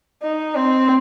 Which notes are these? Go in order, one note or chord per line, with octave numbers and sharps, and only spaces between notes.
D#4
C4